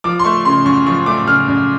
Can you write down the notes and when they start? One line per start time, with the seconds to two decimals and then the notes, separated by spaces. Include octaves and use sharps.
0.04 F3 D6
0.19 C6
0.25 A3 C#6
0.45 C#3 C6
0.65 F#2 C#6
0.86 F3 C#6
1.06 A3 D6
1.27 C#3 F6
1.48 F#2